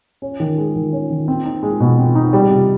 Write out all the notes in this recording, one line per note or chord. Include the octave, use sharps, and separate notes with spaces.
C#4
D#3
G#3
D#3
C#4
D#3
C4
D#4
G#3
B2
C4
D#4
G3
C3